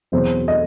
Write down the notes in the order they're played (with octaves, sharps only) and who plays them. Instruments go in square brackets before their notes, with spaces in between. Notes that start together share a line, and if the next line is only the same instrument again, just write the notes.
[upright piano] E2 B2 F#3 C4 C5
D#5